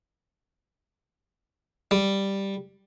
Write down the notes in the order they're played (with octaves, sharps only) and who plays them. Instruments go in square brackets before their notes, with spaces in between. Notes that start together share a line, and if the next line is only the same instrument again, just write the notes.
[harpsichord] G3